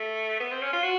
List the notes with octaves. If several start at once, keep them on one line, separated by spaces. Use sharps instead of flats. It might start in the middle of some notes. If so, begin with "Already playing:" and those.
Already playing: A3
B3
C4
C#4
F4
F#4